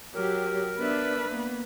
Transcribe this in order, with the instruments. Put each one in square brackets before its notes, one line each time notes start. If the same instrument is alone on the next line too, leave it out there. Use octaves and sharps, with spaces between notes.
[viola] F#3 [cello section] G4 [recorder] A#4
[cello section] B3 D4 E5 [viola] B4
[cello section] A#3 B3